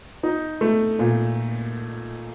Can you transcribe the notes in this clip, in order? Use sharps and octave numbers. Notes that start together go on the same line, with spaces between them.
D#4
A3
A#2